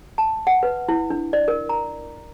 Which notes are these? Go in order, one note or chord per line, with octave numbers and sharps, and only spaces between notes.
A5
F#5
B4
E4
D4
D5
A#4
A#5